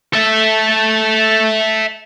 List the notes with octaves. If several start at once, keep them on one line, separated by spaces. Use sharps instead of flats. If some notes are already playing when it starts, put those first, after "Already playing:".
A4 E5